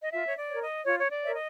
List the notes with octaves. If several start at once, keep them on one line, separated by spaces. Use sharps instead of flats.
D#5
F4 E5
C#5
D5
A#4 C#5
D#5
F4 C#5
C#5
D5
A#4 C#5 E5
D#5